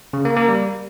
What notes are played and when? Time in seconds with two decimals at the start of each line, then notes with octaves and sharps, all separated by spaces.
0.13 C#3
0.25 A#3
0.37 A#3
0.48 G3